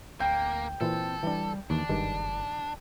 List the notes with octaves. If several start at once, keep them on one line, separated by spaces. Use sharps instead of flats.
D1 A#3 G5
A#2 E3 C4 E4 A4
E3 G3 D4
D#2 E3 D4
F#1 G2 D#3 G#3